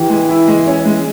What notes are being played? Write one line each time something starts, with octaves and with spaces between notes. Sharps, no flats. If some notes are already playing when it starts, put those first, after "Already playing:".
Already playing: E3 G4
G#3
E4
G#3
C#4
G#3